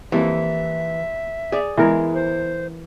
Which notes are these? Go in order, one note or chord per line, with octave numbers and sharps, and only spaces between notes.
F2 E3 G3 A#3 E5
G#4 D5
E2 E3 G#3 A#4
C5